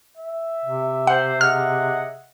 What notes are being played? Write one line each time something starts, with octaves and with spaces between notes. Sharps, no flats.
E5
C3
C5 F#5
G#4 D#5 F#5 F6